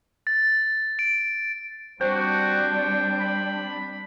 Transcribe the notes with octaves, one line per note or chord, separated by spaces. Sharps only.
A6
D7
G3 C4 D4 F#4 C5 G5
B5